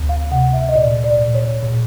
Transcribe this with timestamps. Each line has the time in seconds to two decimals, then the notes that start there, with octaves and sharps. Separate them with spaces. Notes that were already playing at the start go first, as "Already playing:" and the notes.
Already playing: D2
0.09 F5
0.31 C3 F#5
0.53 E5
0.69 D#5
0.76 A#2 D5
1.04 D5
1.19 A#2
1.34 C#5
1.63 A#2